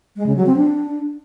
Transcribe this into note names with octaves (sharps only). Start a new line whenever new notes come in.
G#3
C#3
F#3
C4
D4